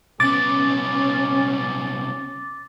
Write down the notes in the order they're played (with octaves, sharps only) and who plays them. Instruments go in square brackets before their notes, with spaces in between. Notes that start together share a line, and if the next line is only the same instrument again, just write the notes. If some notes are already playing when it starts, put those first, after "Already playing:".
[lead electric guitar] C2 B3 [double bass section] C#4 [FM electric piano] D6 A6